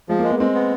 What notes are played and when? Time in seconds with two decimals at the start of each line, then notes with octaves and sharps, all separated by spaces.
0.09 F3 G#3
0.19 A#3
0.24 G#3
0.30 B3
0.39 G#3 C4
0.55 B3